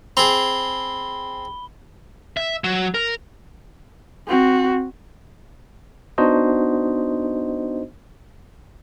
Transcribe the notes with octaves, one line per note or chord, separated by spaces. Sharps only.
C4 G#4 B5 G7
E5
F#3
A#4
C4 F#4
B3 D4 D#4 F#4 C5 D#5